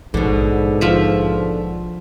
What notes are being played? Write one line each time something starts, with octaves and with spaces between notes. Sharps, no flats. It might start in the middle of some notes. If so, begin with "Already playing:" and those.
A#1 G#2 B2 D3
F3 E5